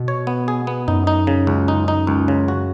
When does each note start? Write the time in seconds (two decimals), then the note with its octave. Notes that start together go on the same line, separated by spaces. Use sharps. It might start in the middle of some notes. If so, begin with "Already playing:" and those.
Already playing: B2
0.08 C#5
0.27 B3
0.48 G#4
0.67 B3
0.88 F#2 D#4
1.07 D#4
1.27 C#3
1.47 C#2
1.68 D#4
1.88 D#4
2.07 C#2
2.28 C#3
2.48 F#4